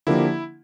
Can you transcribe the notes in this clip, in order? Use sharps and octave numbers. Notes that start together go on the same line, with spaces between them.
D3 F3 A#3 D4 E4 G4